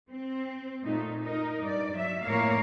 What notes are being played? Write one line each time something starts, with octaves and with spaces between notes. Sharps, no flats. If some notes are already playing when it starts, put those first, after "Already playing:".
C4
A#2 A3 D#4
D#4 A#4
G2 D5
F#3 E5
F2 A2 A#3 A#4 C#5 F5